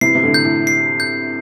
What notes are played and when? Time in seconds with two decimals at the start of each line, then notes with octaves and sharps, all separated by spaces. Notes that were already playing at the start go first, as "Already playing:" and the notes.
0.01 C3 E3 C7
0.15 C3
0.23 A2 D3
0.34 G6
0.45 A2
0.67 C7
1.00 G6